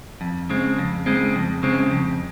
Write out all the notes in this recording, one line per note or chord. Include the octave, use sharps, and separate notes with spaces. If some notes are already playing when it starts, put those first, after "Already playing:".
F2
C#3 G#3 C4
F2
C#3 G#3 C4
F2
C#3 G#3 C4
F2